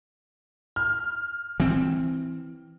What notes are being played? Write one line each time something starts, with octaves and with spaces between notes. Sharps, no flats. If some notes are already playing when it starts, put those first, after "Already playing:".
F6
E3 C4